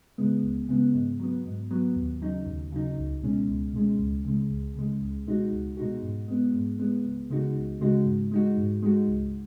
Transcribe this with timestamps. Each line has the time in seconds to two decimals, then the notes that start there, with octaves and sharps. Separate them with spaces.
0.18 C#3 G#3 B3
0.44 C#2
0.69 C#3 G#3 B3
0.94 G#2
1.19 F#3 B3
1.45 G#2
1.71 F#3 B3
1.96 D#2
2.22 C#3 F#3 D#4
2.46 D#2
2.72 C#3 F#3 D#4
2.97 C#2
3.23 B2 G#3 C#4
3.48 C#2
3.73 B2 G#3 C#4
3.99 C#2
4.25 C#3 G#3
4.50 C#2
4.75 C#3 G#3
5.01 C#2
5.26 B2 G#3 D#4 F#4
5.52 C#2
5.77 B2 G#3 D#4 F#4
6.02 G#2
6.28 G#3 B3
6.53 G#2
6.79 G#3 B3
7.05 C#2
7.30 C#3 G#3 D#4 F#4
7.56 C#2
7.80 C#3 G#3 D#4 F#4
8.06 G#2
8.32 G#3 D#4 F#4
8.57 G#2
8.82 G#3 D#4 F#4
9.08 C#2